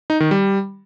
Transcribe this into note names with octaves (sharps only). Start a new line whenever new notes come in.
D#4
D#3
G3